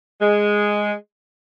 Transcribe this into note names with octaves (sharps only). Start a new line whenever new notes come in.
G#3